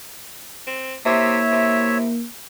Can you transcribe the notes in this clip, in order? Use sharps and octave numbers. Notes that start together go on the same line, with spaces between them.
C4
C3 A#3 E4 C#5 E5
C3